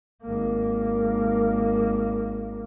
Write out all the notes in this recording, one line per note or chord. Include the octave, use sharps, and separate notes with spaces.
G#1 A#3